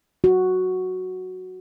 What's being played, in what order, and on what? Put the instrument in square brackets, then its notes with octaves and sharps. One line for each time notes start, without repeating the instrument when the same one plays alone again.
[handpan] F#4